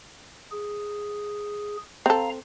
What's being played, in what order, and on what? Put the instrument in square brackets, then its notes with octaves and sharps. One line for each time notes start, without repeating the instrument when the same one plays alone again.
[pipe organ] G#4
[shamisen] C4 A4 [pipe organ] F5 A#5